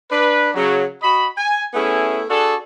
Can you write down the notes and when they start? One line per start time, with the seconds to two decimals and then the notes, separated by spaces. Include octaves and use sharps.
0.11 D4 B4
0.54 C#3 F#3
1.02 F#4 D#5 B5
1.38 G#5
1.74 A3 B3 C#4 E4 G#4
2.29 D4 F#4 G#4 A4